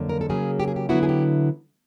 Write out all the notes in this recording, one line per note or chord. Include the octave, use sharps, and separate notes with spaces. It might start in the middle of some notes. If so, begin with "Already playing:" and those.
Already playing: F2 D3 F#3 A#3
A#4
A4
C#3 F#3 A#3 G#4
G4
G#4
G4
D3 F#3 B3 E4 F#4
G#4
G4